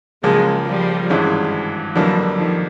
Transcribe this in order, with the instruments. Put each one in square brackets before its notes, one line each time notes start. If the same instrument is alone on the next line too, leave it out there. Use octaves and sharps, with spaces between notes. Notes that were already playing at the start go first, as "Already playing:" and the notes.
[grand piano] C#2 C#3 F3 A#3 [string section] F#3 G#3
[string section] F3 G3
[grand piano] G#1 G2 E3 G#3 C#4
[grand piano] F2 D3 G3 A#3 [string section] E3 F#3
[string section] D#3 F3